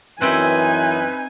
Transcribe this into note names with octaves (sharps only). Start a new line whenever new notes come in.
F#2 E3 C4 D#4 E4 B4 G5 G#5